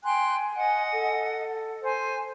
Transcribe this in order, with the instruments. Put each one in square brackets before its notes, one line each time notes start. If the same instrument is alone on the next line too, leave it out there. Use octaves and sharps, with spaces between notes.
[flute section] G5 C6 F#6 [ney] G#5
[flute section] D#5 F#5
[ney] A4
[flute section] C5 G#5